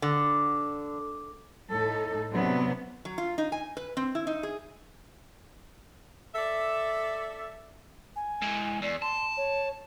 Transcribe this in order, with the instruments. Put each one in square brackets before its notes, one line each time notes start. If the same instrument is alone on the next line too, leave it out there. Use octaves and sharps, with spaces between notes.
[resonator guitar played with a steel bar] D3
[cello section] A2 D#4 A4
C3 F#3 B3 D4
[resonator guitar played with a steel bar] F#3
F4
D#4
G#5
B4
C4
E4
D#4
G#4
[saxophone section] A4 D5 E5
[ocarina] G#5
[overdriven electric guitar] G#3 E4
[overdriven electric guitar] E2 [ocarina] D5
[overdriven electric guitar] A5 [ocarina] C6
[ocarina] C#5